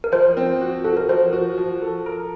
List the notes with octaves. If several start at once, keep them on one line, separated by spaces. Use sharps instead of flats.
A#4
F3 C5
C4
F#4
F#4 A4
A#4
F3 C5
F#4
F3
A4
A#4